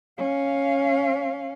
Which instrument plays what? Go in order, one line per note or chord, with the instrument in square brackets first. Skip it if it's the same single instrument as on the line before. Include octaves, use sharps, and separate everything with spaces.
[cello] C#4 F5